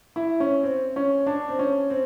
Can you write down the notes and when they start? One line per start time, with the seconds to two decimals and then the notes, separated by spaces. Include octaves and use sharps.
0.16 E4
0.40 C#4
0.63 C4
0.96 C#4
1.27 D4
1.49 C4
1.59 C#4
1.90 C4